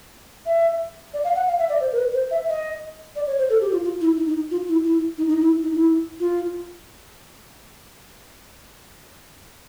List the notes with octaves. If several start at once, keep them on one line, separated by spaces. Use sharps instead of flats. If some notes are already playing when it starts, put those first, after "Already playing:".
E5
D5
F5
F#5
F5
E5
D5
C5
A#4
B4
C5
E5
D#5
D5
C#5
C5
A4
G4
F4
F4
E4
D#4
D#4
F4
E4
E4
D#4
D#4
E4
D#4
E4
F4